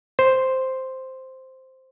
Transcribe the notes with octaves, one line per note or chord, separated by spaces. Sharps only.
C5